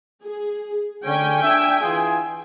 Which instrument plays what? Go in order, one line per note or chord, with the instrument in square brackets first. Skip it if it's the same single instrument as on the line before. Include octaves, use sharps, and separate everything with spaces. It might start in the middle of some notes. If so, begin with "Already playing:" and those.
[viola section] G#4
[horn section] D3 C#4 [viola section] G5 G#5
[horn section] D4 E5
E3 F4 G#4